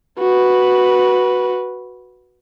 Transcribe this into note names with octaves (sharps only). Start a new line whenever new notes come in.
F#4 B4